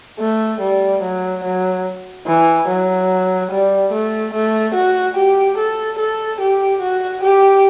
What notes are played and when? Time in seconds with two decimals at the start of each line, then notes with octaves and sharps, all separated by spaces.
0.20 A3
0.61 G3
1.02 F#3
1.44 F#3
2.26 E3
2.68 F#3
3.51 G3
3.92 A3
4.33 A3
4.74 F#4
5.16 G4
5.58 A4
5.98 A4
6.40 G4
6.82 F#4
7.23 G4